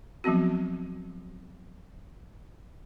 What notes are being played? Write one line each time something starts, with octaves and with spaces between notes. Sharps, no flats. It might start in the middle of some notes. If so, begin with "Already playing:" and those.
F3 F#3 B3 C4 F#4